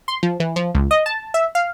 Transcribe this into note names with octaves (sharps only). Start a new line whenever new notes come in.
C6
F3
E3
F3
C#2
D#5
A5
E5
F5